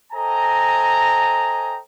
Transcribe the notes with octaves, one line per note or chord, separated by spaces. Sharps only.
A4 C5 D#5 G5 G#5 A#5